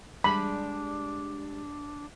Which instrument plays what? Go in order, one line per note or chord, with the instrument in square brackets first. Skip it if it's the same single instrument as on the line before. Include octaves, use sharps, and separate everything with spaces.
[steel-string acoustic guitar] G3 G#3 G4 [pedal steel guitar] D4 [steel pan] B5